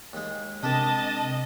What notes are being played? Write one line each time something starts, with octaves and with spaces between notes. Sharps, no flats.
D#2 G#3
C3 G#3 C4 D4 G4 A#4 D#5 A5